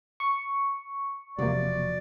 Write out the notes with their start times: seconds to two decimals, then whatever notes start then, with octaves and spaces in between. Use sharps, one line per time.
0.20 C#6
1.38 E1 C3 F3 F#3 A#3 D5